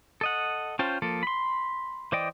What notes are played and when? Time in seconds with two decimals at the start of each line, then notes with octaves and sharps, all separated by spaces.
0.21 A4 D#5 F#5
0.79 C#4 F4 C5 G5 A5
1.02 F3 A#3 A4
1.23 B5 C6
2.12 E3 C5 D5 D#5 G5